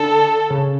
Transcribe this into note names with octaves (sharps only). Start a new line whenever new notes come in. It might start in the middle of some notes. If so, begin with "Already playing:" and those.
Already playing: D3 A4
C#3